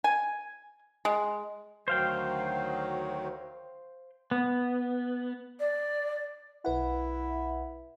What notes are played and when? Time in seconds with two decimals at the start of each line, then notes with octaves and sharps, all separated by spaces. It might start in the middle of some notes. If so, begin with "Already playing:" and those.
0.04 G#5
1.05 G#3
1.88 D2 D#3 F#3 C5 F5 G5
4.31 B3
5.60 D5
6.65 B1 E4 B4 F#5